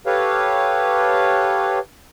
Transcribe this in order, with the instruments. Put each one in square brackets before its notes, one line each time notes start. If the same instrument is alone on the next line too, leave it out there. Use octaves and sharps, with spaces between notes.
[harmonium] G4 A4 B4 C#5 F5